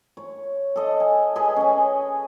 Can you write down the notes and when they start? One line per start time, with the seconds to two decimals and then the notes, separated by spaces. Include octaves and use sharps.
0.17 C#5
0.76 A4 D#5
1.00 G#5
1.36 G#4 B4 D#5
1.56 C#4 G#5